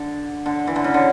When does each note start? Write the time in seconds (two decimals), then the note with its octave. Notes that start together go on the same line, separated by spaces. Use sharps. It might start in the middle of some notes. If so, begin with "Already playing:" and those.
Already playing: D3
0.46 D3
0.67 E3
0.76 D3
0.84 C#3
0.94 D3